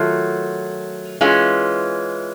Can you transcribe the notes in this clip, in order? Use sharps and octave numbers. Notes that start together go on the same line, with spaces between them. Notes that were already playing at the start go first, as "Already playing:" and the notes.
Already playing: D#3 F#3 A3 F4
E3 G#3 C#4 F4